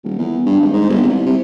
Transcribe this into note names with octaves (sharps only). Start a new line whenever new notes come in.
D#1
E2
G2
G#1
G#2
G1
C2
C3